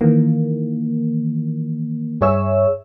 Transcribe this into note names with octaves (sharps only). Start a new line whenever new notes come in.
D#3 E3 A#3
G2 G#4 C#5 E5 E6